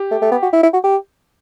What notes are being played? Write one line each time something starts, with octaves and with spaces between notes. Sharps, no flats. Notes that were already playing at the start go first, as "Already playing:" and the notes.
Already playing: G4
A3
A3
B3
F#4
E4
E4
F#4
G4